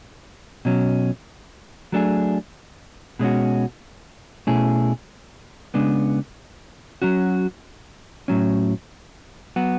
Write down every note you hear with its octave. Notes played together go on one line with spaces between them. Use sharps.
B2 F#3 C#4
F#3 A3 D4 G#4
B2 G#3 C#4 F#4
B2 A3 C#4 E4 G#4
C#3 G#3 B3 D4
F#3 C#4 F#4
A2 F#3 C#4
F#3 B3 F#4